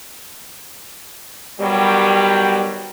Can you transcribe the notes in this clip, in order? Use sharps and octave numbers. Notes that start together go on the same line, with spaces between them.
B2 D#3 F#3 G3